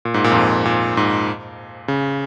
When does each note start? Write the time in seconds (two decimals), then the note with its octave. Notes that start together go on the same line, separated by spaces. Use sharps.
0.05 A#2
0.14 G#2
0.24 A#2
0.31 F2
0.35 G#2
0.65 A#2
0.97 G#2
1.88 C#3